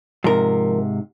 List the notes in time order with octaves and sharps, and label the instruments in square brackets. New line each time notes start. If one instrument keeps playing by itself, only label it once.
[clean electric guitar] G#2 C3 [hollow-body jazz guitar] F3 A#4